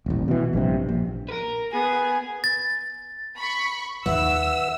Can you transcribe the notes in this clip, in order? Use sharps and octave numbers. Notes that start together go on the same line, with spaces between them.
D#1 A1
B2 E3
A#1 G2 C3
A#1
A#4 B4
B3 G#4 G#5
A6
B5 C#6
D#2 D#3 B4 E5 F#5 E6